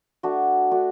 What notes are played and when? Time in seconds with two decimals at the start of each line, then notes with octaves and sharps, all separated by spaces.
0.23 A3 D4 F#4
0.71 A3 D4 F#4